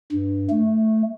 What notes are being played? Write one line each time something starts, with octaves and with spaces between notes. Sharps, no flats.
G2
A3